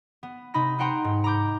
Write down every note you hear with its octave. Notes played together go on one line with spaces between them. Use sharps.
B3
C3 D#4 B5 A#6
B4 C5 F#5 G5 A#5 C6
G#2
A#5 B5 D6 G6